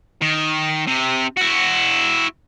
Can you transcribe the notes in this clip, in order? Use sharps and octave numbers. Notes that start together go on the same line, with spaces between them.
D#3
C3
E4 F#4